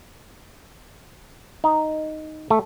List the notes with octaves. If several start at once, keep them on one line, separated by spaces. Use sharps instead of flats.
D#4
A3